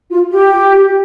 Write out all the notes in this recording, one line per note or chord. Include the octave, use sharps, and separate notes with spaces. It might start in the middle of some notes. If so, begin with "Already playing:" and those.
F4
G4